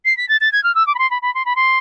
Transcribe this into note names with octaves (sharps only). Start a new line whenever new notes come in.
C7
B6
A6
A6
G#6
F6
E6
D6
B5
C6
B5
B5
C6
B5
C6